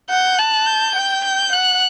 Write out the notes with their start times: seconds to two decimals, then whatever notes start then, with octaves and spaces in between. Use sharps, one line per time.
0.10 F#5 G6
0.38 A5 F#6
0.66 G6
0.95 G5
1.24 G6
1.52 F#5 F#6